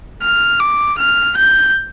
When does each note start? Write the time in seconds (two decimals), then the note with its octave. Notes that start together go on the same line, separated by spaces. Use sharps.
0.22 F6
0.60 D6
0.98 F6
1.37 G6